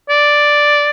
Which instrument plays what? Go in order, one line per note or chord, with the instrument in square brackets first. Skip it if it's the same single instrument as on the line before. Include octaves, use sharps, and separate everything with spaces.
[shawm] D5